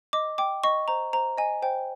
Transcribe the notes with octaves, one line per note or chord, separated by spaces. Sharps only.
D#5 D6
G5 D6
D#5 C#6
C5 A#5
C5 A#5
D#5 G#5
C5 G5